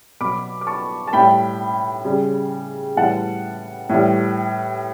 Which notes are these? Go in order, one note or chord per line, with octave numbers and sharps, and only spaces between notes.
B2 F#3 B5 D6
D6
A5 C#6
A5
A2 G3 G5 B5
C#3 G3
A2 E3 G3 F#5 A5
A2 E3 G3